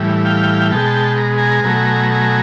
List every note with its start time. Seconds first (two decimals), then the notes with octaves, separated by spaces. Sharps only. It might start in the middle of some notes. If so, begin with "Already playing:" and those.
Already playing: A2 E3 G3
0.25 F5 G5
0.71 B2 G#3 G5 A5
1.18 A#5
1.38 G#5 A#5
1.64 B2 F#3 A3 G#5 A#5
2.11 G#5 A#5